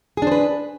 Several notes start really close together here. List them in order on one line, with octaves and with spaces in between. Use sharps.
G#4 D4 C5 B4